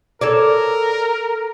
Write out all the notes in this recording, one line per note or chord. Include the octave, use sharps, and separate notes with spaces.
A4 A#4 C#5 D5